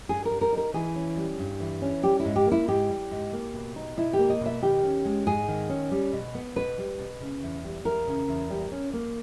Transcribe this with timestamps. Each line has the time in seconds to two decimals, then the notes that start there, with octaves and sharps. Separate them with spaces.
0.09 G2 G#4
0.25 A#4
0.31 G3
0.41 A#4
0.52 D#4
0.57 A#4
0.74 E3 G#4
0.95 C#4
1.17 G3
1.39 G2
1.60 E3
1.82 C#4
2.03 G3 G4
2.20 E4
2.25 G#2
2.36 G4
2.46 A#3
2.52 E4
2.68 G#2 G4
2.90 G3
3.11 G#2
3.33 A#3
3.54 B2
3.76 D#4
3.97 B2 E4
4.13 G4
4.19 A#3
4.30 D#5
4.40 B2
4.46 E5
4.62 D#3 G4
4.83 C#4
5.05 G#3
5.27 G#2 G#4
5.48 D#3
5.69 C#4
5.91 G3
6.12 B2
6.35 B3
6.56 B2 B4
6.78 G3
6.99 B2
7.21 C#3
7.42 E2
7.64 G3
7.85 E2 A#4
8.07 C#3
8.28 E2
8.50 G3
8.72 C#4
8.93 A#3